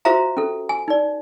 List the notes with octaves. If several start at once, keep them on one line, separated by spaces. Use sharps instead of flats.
F4 F#4 C5 E5 F5 A#5
C#4 A4
G#5
D#4 D5